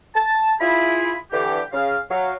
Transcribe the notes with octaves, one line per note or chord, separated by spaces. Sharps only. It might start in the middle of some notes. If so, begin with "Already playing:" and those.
A5
E4 F4 G#4 B5
D3 E3 G4
C#3 F5
F#3 F5